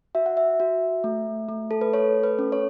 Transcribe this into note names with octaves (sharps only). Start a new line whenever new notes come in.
F#4 E5
F#5
E5
F#4
A3
A3
A4
B4
A4 C#5
B4
C#4
C#5